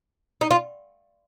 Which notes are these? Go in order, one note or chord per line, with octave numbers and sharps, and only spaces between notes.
D#4
F4